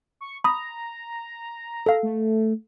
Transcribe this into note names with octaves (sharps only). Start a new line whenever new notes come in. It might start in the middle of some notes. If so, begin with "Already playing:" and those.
C#6
A#5 B5 D#6
A4 F5
A3